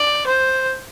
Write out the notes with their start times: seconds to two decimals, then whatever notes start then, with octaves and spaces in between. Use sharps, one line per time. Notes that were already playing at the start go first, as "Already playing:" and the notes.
Already playing: D5
0.27 C5